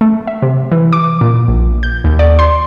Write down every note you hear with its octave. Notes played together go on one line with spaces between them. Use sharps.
A3
E5
C3
E3
D6
A#2
A#1
G6
D#2
D5
C6